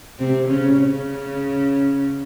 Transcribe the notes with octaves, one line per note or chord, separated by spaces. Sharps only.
C3 C4
C#3 C#4
C#3 C#4